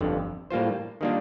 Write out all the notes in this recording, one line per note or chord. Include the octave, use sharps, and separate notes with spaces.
G1 F2 D3
A2 G3 A#3 F4 C5
D#3 G3 A#3 D4 F4